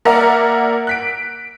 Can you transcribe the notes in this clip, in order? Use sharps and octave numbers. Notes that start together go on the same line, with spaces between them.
A#3 A#4 D5 E5 F#5 A#5
F#6 B6 D7